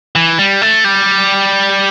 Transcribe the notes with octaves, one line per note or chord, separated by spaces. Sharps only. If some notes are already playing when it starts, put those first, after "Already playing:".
E3
G3
A3
G3